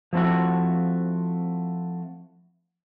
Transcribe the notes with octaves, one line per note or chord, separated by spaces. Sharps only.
F3 A3 C4 E4 F#4